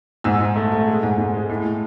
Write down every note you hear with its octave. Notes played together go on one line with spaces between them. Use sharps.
G#2 E6
G#2
A3
A3
G#3
G#2
G#2
G#3
A2
A2